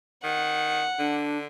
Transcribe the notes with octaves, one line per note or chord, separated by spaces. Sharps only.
D#3 F#5
D3 D4